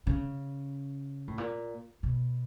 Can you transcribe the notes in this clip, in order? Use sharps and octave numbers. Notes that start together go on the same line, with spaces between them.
C#3
A2
A#2
B2